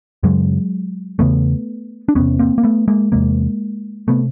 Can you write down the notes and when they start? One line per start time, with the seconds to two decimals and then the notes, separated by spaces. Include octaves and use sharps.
0.23 F#2 C#3 F#3 G#3
1.19 E2 C#3 A3 B3
2.09 D4
2.15 E2 C3 B3 C#4
2.39 A#3 C4
2.58 A#3
2.63 A3 B3
2.88 G#3 A#3
3.12 E2 C3 G#3 A#3
4.08 C3 A3 B3